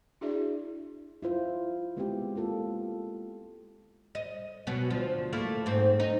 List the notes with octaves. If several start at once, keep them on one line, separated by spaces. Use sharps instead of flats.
D4 E4 F#4 G#4 D5 E5
E4 F4 C5
G#3 B3 C4 E4 G4 G#4
G#3 A#3 F4 A4
D#5
B2 F#3 B3
D2 F3
A3 A#3 E4
G#2 C4
D#4